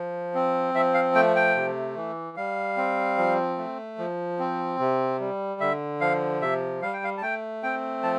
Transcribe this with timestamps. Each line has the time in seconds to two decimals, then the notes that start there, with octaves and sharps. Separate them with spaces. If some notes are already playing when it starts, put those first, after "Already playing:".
Already playing: F3
0.34 C4
0.74 F3 E5
0.94 F5
1.15 A3 G5
1.36 G5
1.56 C3
1.96 E3
2.37 G3 F5
2.77 C4
3.18 F3
3.58 A3
3.98 F3
4.39 C4
4.79 C3
5.20 G3
5.60 D3 E5
6.01 F3 F5
6.41 C3 E5
6.82 G3 F5
6.93 G5
7.04 F5
7.18 A5
7.22 A3 G5
7.63 C4 G5
8.03 F3 A5